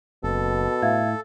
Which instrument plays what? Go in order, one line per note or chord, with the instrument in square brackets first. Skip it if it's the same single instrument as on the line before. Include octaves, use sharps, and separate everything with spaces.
[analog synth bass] F#1 [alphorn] B2 [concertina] A4
[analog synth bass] A2 [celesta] E5 F5 G#6